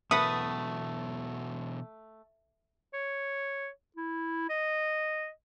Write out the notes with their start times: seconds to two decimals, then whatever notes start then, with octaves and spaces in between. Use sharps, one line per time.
0.11 B2 E3 F#3 A3 B4 F#5 D#6
2.94 C#5
3.96 E4
4.49 D#5